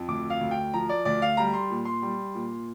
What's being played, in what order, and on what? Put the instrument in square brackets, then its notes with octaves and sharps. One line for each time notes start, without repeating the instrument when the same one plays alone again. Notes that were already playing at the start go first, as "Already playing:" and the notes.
Already playing: [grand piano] F2
D2 D6
F5
D2
G5
F3 A#5
D5
D2 D5
F5
G3 A#5
C6
A#2
C6
G3
A#2